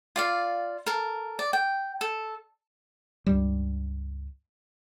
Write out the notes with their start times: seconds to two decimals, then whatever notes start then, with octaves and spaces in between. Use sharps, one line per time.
0.16 F4 D5 F5
0.86 A4 A#4
1.39 D5
1.53 G5
2.01 A4
3.26 C#2 G2 G3